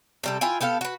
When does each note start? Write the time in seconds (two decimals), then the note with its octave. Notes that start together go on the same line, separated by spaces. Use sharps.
0.24 C3 G3 A4
0.41 E4 F4 G5 G#5
0.61 B3 G4 A4 F5
0.81 F#4 B4